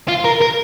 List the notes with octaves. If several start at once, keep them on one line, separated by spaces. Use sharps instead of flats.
F4
A#4
A#4